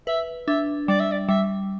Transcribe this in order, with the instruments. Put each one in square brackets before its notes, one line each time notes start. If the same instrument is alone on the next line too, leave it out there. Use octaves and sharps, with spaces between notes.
[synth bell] B4 [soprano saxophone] E5
[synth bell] D4 [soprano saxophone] E5
[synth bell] G3 [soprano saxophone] D5
[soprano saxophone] E5
D5
[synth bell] G3 [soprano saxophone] E5